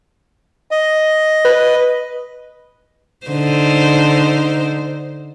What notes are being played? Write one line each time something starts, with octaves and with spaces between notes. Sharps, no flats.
D#5
B4
D3 D#4 C5